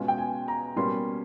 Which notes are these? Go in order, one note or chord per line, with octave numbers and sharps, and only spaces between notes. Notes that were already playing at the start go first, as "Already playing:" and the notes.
Already playing: B2 G#3 C#4 F4
G5
G#5
A#5
B2 G3 A#3 C#4 C6